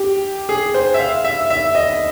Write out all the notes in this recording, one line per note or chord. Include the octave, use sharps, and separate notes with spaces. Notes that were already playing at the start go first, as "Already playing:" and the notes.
Already playing: G4
G#4
C5
E5
F5
E5
E5
D#5